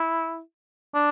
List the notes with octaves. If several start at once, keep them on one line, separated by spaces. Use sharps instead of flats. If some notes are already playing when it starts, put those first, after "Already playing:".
Already playing: E4
D4